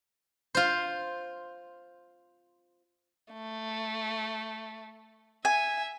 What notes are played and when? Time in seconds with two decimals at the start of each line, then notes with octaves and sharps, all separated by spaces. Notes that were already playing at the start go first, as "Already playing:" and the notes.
0.55 F4 C5
3.33 A3
5.45 E5 G#5